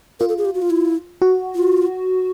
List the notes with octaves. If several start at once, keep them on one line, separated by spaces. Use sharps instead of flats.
F4 A#4
A4
G#4
G4
F#4
F4
E4
F#4
F4